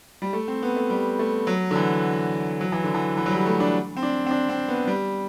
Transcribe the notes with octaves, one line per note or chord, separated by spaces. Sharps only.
G3
A3
C4
B3
A3
G3
A3
F#3
D3
E3
F#3
E3
D3
E3
E3
F#3
G3
A3
D4
C4
D4
C4
D4
C4
B3
G3